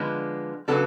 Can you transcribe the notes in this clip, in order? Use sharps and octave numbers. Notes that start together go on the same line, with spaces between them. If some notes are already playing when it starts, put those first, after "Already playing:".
Already playing: D3 F3 G#3 B3 D4
C#3 F#3 B3 D4 A4